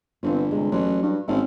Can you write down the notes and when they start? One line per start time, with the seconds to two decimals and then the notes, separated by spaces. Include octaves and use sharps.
0.23 G1 E3 C4 F4
0.51 C3 G#3
0.72 A1 F#3
1.02 G2
1.28 G#1 C4 C#4 E4